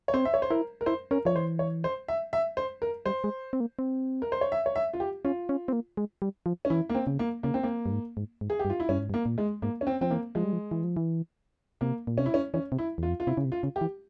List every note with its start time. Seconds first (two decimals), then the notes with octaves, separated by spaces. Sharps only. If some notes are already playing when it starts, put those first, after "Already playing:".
0.08 C#5
0.14 C4 C5
0.25 E5
0.34 C#5
0.42 C5
0.50 E4 A#4
0.81 A#4
0.86 E4 C5
1.11 C#4 A#4
1.25 F3 C#5
1.36 E3 C5
1.59 C#5
1.84 C5
2.08 E5
2.33 E5
2.57 C5
2.82 A#4
3.06 G3 C5
3.24 G#3
3.53 C4
3.60 A#3
3.79 C4
4.22 A#4
4.32 C5
4.41 C#5
4.52 E5
4.66 C#5
4.76 E5
4.93 F4
5.00 G4
5.25 C#4 F4
5.49 C#4
5.68 C4
5.73 A#3
5.97 G#3
6.22 G3
6.46 F3
6.65 C#4
6.70 E3 E4
6.90 A#3
6.95 C4
7.07 C#3
7.19 A#3
7.43 C#3 A#3
7.54 C4
7.63 A#3
7.86 G2
7.92 G#2
8.17 G#2
8.41 G#2
8.50 G#4
8.59 G4
8.65 G2
8.70 F4
8.80 E4
8.89 G2 C#4
8.99 G#2
9.10 G2
9.14 A#3
9.26 A#2
9.38 G#3
9.62 G#2 A#3
9.81 C#4
9.87 C4
10.01 F3 C4
10.10 E3 A#3
10.35 F3 G#3
10.44 G3
10.53 F3
10.71 E3
10.84 F3
10.97 E3
11.81 C3 A#3
12.07 A#2
12.18 C3 C#4
12.26 E4
12.34 C#4
12.54 E3 C#4
12.72 C3
12.79 E4
12.98 E2 F4
13.09 F2
13.20 F4
13.27 C3 E4
13.37 C#3
13.45 C3
13.52 F4
13.63 C#3
13.76 G4
13.81 E3